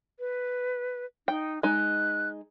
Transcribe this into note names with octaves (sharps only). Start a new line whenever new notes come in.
B4
D#4 G5
G#3 D#4 F#6